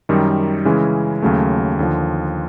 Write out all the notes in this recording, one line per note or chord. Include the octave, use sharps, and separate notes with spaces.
F#2 D#3 G3
C#3 E3 G#3 C#4
D#2 C#3 F#3 A3
D#2 D3 F3